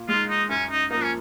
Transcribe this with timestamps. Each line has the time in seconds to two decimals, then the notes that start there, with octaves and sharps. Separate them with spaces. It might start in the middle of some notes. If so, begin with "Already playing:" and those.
Already playing: A#2
0.09 G#3 D#4 F4
0.29 D#4
0.49 F#2 C#4
0.70 D#4
0.90 F3 A#3 D#4
1.03 C#4